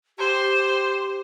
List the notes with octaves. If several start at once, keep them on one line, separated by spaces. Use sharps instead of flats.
G4 C5